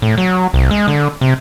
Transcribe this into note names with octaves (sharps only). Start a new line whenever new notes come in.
A2
F#3
C2
G#3
D3
C3